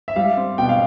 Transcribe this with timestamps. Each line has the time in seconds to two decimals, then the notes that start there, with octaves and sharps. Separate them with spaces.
0.08 E5
0.16 G3 F5
0.37 C4
0.58 B2 G5
0.69 F5